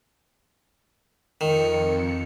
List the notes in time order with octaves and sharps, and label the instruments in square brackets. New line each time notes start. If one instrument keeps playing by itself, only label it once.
[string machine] F2 C#7 [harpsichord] D#3